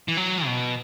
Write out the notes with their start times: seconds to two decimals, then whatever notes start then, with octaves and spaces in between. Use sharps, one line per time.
0.08 E3
0.17 F#3
0.45 B2